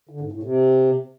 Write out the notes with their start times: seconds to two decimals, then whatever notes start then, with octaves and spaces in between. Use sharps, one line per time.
0.09 D3
0.21 G#2
0.32 A2
0.43 C3